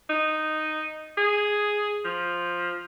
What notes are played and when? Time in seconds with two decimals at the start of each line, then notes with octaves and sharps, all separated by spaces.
0.10 D#4
1.18 G#4
2.05 F3